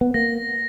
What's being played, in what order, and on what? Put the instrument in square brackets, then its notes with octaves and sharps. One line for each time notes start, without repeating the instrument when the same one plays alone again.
[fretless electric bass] B3
[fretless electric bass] A#3 [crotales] A#6